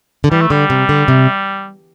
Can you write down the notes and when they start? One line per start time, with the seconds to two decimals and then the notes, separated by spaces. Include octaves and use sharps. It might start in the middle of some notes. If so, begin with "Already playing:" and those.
0.24 D3
0.31 E3 G3
0.41 A3
0.50 D3 G3
0.70 C3
0.89 D3
1.08 C3